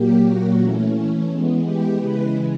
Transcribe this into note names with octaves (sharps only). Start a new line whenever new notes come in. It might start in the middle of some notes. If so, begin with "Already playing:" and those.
Already playing: A#2 F#3 A#3 G4
F#4
E3 A3 C#4
E3 G#3 B3
G4
C#3 E3 G#3 B4